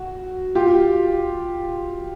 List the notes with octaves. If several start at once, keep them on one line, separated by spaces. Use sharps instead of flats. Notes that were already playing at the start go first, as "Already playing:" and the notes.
Already playing: F#4
F4 G4